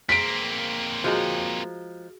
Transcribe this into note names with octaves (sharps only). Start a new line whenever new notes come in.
A#3 C4 G#4 B6 D7
F3 G#3 F#4 G#4 A#5